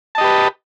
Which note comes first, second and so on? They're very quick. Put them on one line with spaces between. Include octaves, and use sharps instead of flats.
A5 D#5 G4 B4